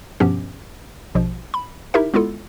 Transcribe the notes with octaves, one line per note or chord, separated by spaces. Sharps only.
G2 B2 F3 B3 C#4 G4
A#1 B2 F3
B5
D#4 E4 G4 A#4 E5
G#3 B3 E4 F4 A4